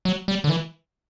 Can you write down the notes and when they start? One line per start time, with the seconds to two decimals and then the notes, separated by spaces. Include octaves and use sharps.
0.05 F#3
0.28 G3
0.44 D3
0.49 E3